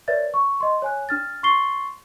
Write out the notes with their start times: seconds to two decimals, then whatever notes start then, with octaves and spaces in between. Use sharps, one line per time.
0.08 A#4 B4 C#5 D5 E5 A6
0.34 C#6
0.60 D#5 C6
0.82 C#5 G#5 F#6
1.09 D4 F6 A6
1.43 C6 C#6 A6 C7 G7